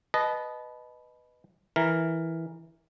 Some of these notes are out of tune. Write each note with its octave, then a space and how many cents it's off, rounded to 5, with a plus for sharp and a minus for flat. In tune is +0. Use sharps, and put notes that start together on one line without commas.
B4 +0 D#5 -10 A5 -30
E3 -5 A#4 +0